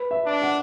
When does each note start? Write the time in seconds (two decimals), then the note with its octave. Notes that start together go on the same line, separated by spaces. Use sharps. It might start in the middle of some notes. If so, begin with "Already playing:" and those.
Already playing: B4
0.11 E5
0.26 D4
0.42 F#5